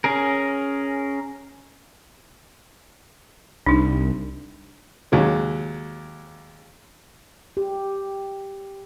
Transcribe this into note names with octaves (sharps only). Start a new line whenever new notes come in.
C#4 G#4 A#4
C2 D4 D#4
D#2 F#3 G#3
G4